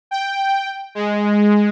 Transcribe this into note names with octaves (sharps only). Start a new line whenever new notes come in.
G5
G#3